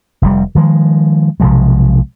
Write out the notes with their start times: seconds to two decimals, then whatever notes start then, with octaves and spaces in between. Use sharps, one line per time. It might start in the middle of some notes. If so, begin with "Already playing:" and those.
0.22 F1 C3 G3
0.55 D#3 F3 G#3
1.40 B1 C3 F3 G#3